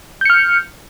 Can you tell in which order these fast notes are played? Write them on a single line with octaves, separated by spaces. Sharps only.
G6 C#7 F6